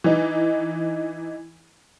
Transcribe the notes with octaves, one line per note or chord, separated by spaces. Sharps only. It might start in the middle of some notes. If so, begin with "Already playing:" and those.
E3 D#4